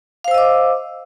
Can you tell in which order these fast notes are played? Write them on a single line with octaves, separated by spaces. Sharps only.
F5 C5 E6 D#5 D6